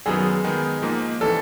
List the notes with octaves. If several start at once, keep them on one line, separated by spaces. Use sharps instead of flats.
F#2 D#3 F#3 B3 G#4
D#3 G#3 B3 D#4
G#2 F3 A#3 D#4
E3 A3 C4 A4